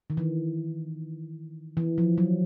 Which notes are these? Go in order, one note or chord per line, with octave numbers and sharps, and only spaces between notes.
D#3
E3
E3
F3
F#3